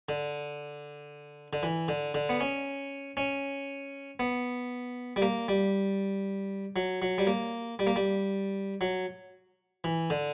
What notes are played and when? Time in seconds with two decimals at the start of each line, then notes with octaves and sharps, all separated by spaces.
0.09 D3
1.53 D3
1.63 E3
1.88 D3
2.14 D3
2.29 B3
2.41 C#4
3.17 C#4
4.19 B3
5.16 G3
5.22 A#3
5.48 G3
6.76 F#3
7.02 F#3
7.18 G3
7.27 A#3
7.79 G3
7.87 A#3
7.96 G3
8.81 F#3
9.84 E3
10.10 D3